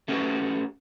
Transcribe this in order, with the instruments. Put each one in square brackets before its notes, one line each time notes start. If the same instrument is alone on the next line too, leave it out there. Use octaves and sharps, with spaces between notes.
[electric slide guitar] A3 C#4 F#4 G4 B4